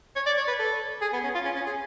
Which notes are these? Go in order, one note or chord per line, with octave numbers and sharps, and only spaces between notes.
C#5
D5
C#5
B4
A4
G#4
B3
C#4
F4
C#4
C#4
G#4